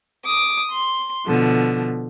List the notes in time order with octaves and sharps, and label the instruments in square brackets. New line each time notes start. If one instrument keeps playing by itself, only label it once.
[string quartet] D6 D#6
C6
B2 D3 F3